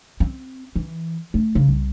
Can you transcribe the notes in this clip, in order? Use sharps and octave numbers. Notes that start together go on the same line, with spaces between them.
C4
E3
A3
C#3
C2